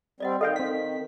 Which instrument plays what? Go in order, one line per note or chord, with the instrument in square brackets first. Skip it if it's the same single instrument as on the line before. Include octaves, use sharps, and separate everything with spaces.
[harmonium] G3 C4 [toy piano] D5 D#5 F#5
[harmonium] D#3 [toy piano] A4 [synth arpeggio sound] D#5 F5 G5
[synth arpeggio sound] C4 B6